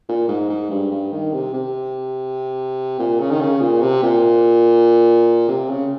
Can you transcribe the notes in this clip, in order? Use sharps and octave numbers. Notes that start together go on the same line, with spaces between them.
A#2
G#2
G#2
G2
G2
D#3
C3
C3
A#2
C#3
D#3
C#3
A#2
C3
A#2
C3
C#3